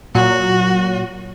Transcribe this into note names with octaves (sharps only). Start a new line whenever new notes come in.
A#2 F#3 F#4